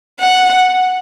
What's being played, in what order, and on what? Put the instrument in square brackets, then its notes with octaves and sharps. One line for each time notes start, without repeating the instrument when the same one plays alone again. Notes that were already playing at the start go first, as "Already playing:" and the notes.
[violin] F#5